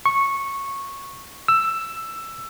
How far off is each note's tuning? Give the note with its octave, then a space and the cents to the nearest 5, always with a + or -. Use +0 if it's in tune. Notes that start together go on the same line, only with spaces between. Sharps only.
C#6 -10
E6 +10